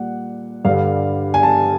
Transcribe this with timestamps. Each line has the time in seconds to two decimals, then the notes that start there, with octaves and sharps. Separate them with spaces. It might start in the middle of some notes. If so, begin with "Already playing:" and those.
Already playing: A#2 G3 F#5
0.65 G2 D3 G3 F5
1.34 G#5
1.43 A5